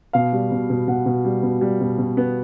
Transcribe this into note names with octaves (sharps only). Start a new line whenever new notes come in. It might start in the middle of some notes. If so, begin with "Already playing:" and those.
B2 F5
G3
B2
B2
B2 F#5
B2
G3
B2
G3
B2
B2
B3